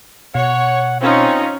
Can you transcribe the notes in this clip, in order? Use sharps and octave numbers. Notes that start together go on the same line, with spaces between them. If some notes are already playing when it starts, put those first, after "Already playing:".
B2 C#5 F#5
C4 C#4 D#4 F4